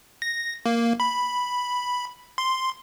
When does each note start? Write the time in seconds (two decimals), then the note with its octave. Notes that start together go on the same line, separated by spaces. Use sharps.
0.22 A#6
0.66 A#3
1.00 B5
2.38 C6